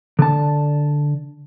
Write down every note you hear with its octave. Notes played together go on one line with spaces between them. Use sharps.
D3 A5